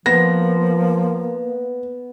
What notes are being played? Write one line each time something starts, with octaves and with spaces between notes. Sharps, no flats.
F3 A#3 B3 A#6